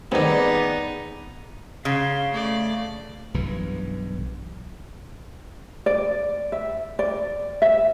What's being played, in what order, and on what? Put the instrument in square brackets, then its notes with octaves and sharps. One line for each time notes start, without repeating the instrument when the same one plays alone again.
[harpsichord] C3 D#3 [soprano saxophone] B3 [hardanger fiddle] D#4 [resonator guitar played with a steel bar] G#4 D5
[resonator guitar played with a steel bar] C#3 [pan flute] F5 [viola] C6
[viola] A3 D5
[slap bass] B1 G2 E3
[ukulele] D5
E5
D5
E5